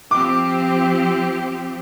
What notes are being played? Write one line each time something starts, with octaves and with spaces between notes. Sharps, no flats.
F3 C4 G4 D6